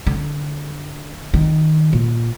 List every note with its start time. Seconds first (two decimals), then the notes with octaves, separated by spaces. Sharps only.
0.06 D3
1.34 D#3
1.93 A#2